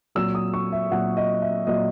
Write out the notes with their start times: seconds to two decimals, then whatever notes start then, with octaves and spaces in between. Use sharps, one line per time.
0.15 A#2 F#3 E6
0.35 D#6
0.54 C#6
0.72 E5
0.91 A#2 F#3 F#5
1.17 D#5
1.42 E5
1.67 A#2 F#3 D#5